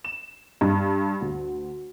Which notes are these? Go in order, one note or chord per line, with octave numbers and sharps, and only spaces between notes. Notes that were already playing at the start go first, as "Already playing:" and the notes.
E7
G2
D2